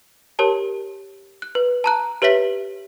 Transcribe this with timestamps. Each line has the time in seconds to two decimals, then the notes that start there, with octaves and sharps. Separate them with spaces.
0.39 G4 A#4 C#5 A5
1.42 F#6
1.55 B4
1.84 A5 A#5 F#6
2.22 G4 B4 C#5 E5 B6 F#7